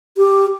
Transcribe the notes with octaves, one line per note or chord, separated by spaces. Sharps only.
G4